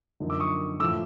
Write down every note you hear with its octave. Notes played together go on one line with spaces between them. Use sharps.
F#2 D3 F3 A#3 D#4
D6 E6
C#6 D#6
A2 F3 A3 D6 E6